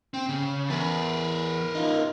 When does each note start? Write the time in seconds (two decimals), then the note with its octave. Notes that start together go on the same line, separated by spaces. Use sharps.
0.14 C4
0.29 C#3
0.70 E2 A#4 B4
1.75 D#4 F4